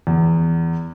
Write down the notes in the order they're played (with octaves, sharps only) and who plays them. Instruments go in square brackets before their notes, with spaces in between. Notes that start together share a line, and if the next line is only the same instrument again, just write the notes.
[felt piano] E2